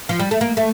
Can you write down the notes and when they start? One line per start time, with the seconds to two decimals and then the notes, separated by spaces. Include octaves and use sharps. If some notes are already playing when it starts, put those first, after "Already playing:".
0.09 F3
0.19 G3
0.31 A3
0.41 A#3
0.57 A3